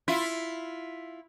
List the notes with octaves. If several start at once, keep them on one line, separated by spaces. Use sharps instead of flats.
E4 F4